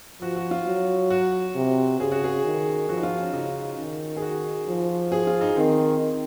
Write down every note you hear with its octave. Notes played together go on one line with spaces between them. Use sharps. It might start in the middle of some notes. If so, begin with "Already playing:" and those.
F3 F#4
F#4
F4
F#3
F#4
C3
C#3 G#4
F#4
G#4
D#3
F3 F#4
D#4
F4
C#4
C#3 D#4
D#3
G#4
F#4
F3
G#4
F4
D#4
D#3 C4